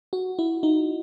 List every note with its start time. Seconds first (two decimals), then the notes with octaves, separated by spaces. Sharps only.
0.13 F#4
0.39 E4
0.63 D#4